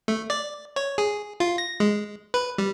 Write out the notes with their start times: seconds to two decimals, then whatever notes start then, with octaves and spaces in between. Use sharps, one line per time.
0.08 A3
0.30 D5
0.76 C#5
0.98 G#4
1.40 F4
1.58 A#6
1.80 G#3
2.34 B4
2.58 G3